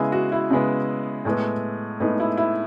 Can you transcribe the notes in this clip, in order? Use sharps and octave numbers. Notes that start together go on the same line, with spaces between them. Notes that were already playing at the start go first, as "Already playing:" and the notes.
Already playing: C#3 G#3 B3 E4 G#4
F#4
E4
C#3 G#3 B3
A2 G#3 B3
A2 G#3 B3 D#4
E4
E4